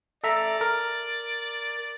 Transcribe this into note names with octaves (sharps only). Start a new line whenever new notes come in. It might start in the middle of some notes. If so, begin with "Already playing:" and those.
A4 D5 E5 A#5
A#4